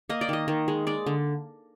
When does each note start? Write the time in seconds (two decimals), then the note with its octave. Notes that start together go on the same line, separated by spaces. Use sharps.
0.09 A#3 D#5
0.21 D5
0.29 D#3 D#5
0.48 D#3
0.68 G#3
0.87 G#3 D5
1.06 D3